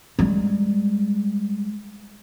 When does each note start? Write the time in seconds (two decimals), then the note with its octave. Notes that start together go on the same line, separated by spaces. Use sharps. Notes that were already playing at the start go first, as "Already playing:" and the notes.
0.19 G3 G#3